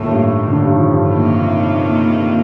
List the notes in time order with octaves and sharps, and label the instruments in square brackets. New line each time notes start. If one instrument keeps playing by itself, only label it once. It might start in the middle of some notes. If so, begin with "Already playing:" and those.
Already playing: [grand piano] A2 A3 [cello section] D#3 A#3 F4
[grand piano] G2 G3
D3 D4
G2 G3
D#3
F3
G2 G3
[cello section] C3 D#3 A#3 F4